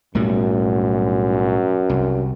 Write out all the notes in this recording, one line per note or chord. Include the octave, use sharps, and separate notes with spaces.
B1 F#2 A2 G3
C2